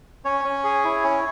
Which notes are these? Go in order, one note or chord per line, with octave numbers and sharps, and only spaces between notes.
C#4 C#5
C#4
G#4
E4
C#4